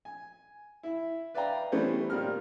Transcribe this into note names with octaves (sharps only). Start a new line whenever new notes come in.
G#5
E4 E5
B4 D5 E5 F5 G5 A#5
E3 G3 A3 B3 C#4 C5
A#2 D#3 G3 A#4 F6